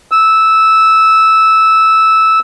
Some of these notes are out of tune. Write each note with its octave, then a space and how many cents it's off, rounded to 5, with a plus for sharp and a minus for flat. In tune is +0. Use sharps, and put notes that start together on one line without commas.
E6 -10